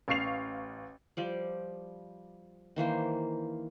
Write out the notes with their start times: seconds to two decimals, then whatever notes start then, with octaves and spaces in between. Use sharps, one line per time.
0.08 A1 F5 C#6 C7 F7
1.17 F3 G3 D5
2.76 D#3 E3 A#3 C5